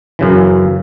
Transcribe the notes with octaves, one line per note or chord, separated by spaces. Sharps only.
F#2 C#3 E3